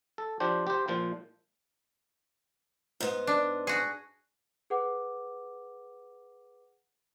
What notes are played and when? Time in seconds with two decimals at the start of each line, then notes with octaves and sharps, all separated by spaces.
0.18 A4
0.40 F3 D4 G4 C5
0.67 G4 C5
0.88 A#2 F3 C5
3.00 G#2 B3
3.27 D4
3.67 F#4 G#4
4.70 G#4 B4 F#5 D6